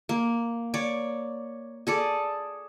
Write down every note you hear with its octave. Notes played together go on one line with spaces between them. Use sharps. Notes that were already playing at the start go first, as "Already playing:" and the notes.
A#3
C#5 D5
G#4 A4 D5